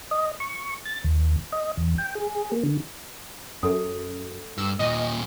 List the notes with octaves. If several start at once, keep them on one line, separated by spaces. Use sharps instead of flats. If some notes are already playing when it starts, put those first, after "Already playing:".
D#5
C#6
A6
D#2
D#5
E2
G5
G#4
A#3
D3
F#2 A4 D#6
G2 E6
D#2 A#2 D#5